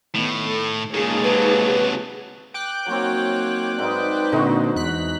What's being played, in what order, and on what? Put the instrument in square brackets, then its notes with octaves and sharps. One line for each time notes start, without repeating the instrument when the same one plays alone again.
[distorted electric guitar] A2 [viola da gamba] D#3 B3
[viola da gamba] A4
[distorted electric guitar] A#2 C#3 [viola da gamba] G#3 A#3 C#5 [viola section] D#4 G#4 A5
[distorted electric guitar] C3 F#3 [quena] B4
[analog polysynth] G5 D6 F#6
[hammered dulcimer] F#3 C4 [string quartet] A#3 D#4 C#5
[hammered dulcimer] G#2 D#4 [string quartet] B4 C5 D5
[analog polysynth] A#2 D3 C4 [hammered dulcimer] D#4 F#4
[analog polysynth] E2 F#6 B6